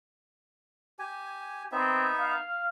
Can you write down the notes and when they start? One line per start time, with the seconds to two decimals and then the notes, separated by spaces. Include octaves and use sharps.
0.99 G4 G#5
1.72 B3 C4 D#4 E5
2.19 F5